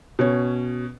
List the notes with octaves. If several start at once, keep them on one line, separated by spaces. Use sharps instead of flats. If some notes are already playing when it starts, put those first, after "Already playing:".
B2 C#4 C#5